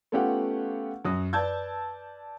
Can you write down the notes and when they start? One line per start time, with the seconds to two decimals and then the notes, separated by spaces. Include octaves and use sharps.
0.12 A3 B3 C#4 F4 G4 F#5
1.05 F#2 F#3 D#6
1.33 B4 D5 A5 E6 G6 G#6